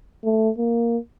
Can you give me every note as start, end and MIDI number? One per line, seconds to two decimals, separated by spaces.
0.24 0.49 57
0.58 0.97 58